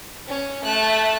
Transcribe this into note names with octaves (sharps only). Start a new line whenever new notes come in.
C#4
A3 F#6